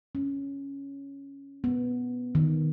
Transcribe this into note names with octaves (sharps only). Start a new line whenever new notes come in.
C#4
B3
D#3